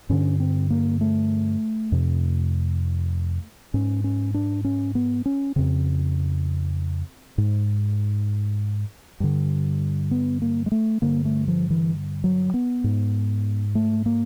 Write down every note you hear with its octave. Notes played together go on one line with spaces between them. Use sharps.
G2 D3 C#4
C4
A#3
A3
F2 C3
G#2 C#4
C#4
D4
C#4
B3
C#4
F2 C#3 C4
G#2
G2 D3
B3
A#3
G#3
A3
G2 D3 A#3
A3
F3
E3
F#3
B3
G#2
A3
A#3